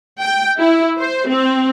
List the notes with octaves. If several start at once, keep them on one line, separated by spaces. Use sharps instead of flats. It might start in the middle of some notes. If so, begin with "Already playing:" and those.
G5
E4
C5
C4